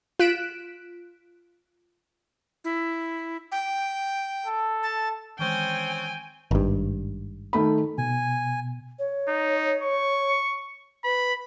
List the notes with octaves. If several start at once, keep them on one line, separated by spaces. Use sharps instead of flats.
F4 F#6 B6 D7 E7
E4
G5
A4
A5
D#3 E3 G#3 C4 C#4 C5 G5 G#5
G#1 G2
D#3 A3 B5
B2 G#5
C#5
D#4
C#6
B4 B5